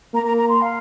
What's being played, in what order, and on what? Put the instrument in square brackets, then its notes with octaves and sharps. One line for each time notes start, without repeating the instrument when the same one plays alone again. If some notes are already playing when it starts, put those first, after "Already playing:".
[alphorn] A#3 [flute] A#5
[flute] A#5
A#5
C6
F5